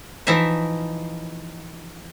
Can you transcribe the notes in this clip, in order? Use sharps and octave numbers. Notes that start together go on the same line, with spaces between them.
E3 F3 D#4 E5